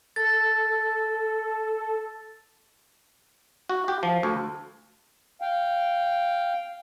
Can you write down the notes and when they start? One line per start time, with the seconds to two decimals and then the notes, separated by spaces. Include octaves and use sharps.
0.16 A4 A6
3.69 F#4
3.88 G4
4.03 F3
4.23 D2
5.41 F5 G5